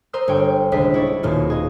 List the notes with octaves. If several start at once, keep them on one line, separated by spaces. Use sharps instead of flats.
A#4 C5 C6 D#6 E6
G1 C#5 G5
D#1 C#2 D4 C5 D#5 B6
E4 C#5 D5
D#1 D#2 B2 D#4 F4 C#5
G#4 D#5